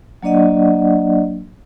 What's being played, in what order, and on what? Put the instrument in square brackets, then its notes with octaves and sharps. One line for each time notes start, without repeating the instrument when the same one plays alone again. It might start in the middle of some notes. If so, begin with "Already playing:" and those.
[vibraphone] F#3 A#3 D4 D5 D#5 F#5